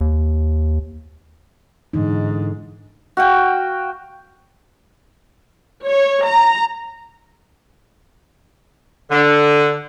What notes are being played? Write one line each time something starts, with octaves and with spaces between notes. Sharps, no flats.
D#2
G#2 D3 E3 D#4
F#4 F5 G5
C#5
A#5
D3